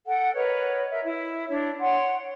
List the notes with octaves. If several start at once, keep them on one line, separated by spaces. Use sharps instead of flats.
A4 F#5 G5
A#4 B4 C#5 D#5
A#4 E5
E4
D4 E4 C#5
C#5 F#5 G5 C6